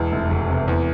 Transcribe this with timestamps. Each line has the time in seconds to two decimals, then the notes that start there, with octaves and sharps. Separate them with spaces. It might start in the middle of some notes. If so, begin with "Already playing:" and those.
Already playing: E1 E2
0.12 F1
0.31 F1
0.50 C3
0.68 E2